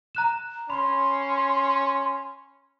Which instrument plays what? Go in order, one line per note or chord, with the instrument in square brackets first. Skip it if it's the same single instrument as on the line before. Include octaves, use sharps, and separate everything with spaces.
[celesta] A#5 F#6 E7
[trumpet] C#4 [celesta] B5 [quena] C6